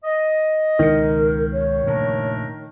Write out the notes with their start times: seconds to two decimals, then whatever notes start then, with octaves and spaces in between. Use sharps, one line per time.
0.04 D#5
0.79 C#2 B2 D#3 A#4
1.53 C#5
1.87 A#2 C#3 F3 A3 D4 A#4